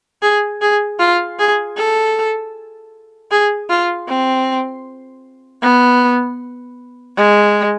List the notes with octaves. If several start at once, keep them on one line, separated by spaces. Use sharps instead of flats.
G#4
G#4
F4
G#4
A4
G#4
F4
C4
B3
G#3